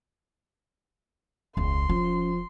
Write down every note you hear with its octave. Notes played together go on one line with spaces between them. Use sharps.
E1 C#2 C6
F3 C#4